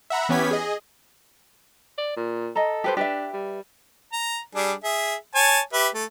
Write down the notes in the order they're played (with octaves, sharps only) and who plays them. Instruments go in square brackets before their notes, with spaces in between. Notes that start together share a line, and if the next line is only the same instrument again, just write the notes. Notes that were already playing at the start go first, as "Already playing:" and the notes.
[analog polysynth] E5 F#5 A#5 B5
E3 B3 C#4 G4 G#6 B6
G#4 D#5
[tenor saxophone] D5
A#2
[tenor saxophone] A4 [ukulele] D#5 A#5
[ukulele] G4 B4 C5
[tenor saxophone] D4 [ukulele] G4 B4 E5
[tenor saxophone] G3
[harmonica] A#5
G3 D4 G#4
G#4 E5
C#5 G#5 A5
G4 B4 E5
A3